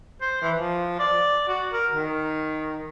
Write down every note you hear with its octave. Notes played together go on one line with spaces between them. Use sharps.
C5
E3
F3
D5
F#4
A#4
D#3